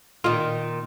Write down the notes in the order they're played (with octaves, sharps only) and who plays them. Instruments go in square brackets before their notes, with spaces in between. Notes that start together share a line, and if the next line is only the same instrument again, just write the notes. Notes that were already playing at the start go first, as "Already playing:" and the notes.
[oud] A#2 D#3 [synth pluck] F4